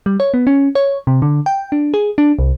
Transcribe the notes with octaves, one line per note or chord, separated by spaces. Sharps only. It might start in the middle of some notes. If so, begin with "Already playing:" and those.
G3
C#5
B3
C#4
C#5
C3
D3
G5
D4
G#4
D4
C2